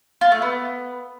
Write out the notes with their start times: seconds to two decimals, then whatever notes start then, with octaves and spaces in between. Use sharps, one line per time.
0.21 F4
0.32 A3
0.42 B3